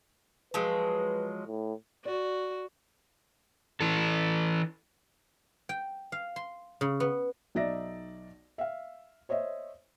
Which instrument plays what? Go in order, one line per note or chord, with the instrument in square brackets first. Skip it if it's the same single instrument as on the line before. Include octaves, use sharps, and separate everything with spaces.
[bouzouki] F3 F#3 G#3 [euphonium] B4
[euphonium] A2
[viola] F#4 [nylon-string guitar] D5
[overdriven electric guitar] E3 A4
[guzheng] G5
F5
C6
C#3
B3
[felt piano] B1 D#4 D5 E5 A#6
E5 F5
C5 C#5 D#5 E5